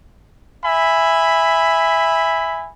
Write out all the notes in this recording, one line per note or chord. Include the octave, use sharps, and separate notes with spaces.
E5 G#5 B5